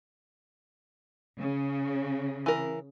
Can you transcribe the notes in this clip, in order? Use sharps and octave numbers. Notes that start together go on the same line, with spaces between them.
C#3
E3 A#4